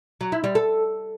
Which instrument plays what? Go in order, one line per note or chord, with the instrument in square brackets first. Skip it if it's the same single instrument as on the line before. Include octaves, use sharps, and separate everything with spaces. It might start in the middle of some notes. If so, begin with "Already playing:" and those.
[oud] F#3
E4
G3
A4